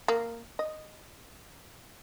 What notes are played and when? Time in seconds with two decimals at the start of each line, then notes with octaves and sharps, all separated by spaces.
0.08 A#3
0.59 D#5